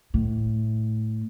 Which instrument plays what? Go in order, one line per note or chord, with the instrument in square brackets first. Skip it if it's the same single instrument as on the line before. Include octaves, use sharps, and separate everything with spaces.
[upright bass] A2